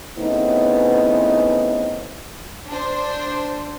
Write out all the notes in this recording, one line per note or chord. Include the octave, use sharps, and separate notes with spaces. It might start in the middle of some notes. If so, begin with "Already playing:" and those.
C#3 E3 A3 B3 C4 D#4
D4 C5